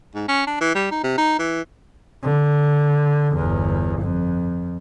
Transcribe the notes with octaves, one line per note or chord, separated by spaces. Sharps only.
G#2
C#4
D4
E3
G3
D#4
C3
D#4
E3
D3
G1 E2
F2